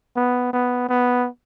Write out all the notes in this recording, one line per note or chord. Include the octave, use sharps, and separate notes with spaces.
B3
B3
B3